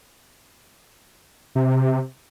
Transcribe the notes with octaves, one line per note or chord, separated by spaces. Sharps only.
C3